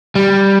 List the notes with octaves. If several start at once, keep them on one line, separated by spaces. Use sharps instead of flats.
G3